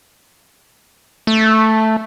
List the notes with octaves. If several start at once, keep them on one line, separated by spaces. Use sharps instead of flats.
A3